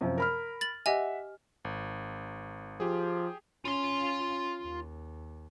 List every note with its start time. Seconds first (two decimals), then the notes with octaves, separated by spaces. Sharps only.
0.01 F#2 C3 F3
0.18 A#4 B5 F6
0.61 A6 F#7
0.86 G4 D#5 E5 F#5 G#5
1.65 G#1
2.80 F3 G4 G#4
3.65 C#4 F4 C6
4.62 D#2